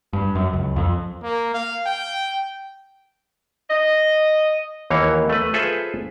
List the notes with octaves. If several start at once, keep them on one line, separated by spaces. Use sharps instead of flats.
G2
F#2
C#2
F2
A#3
F5
G5
D#5
D#2 E3 A#3 C#5
A3 B4
F4 G#4 A4 B4 C5 E5